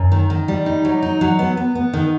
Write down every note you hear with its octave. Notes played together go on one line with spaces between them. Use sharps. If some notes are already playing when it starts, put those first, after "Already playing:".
Already playing: F#2
D#3
D#3
G3
D#4
F#3
D#4
F#3
B3
B3
B3
D#3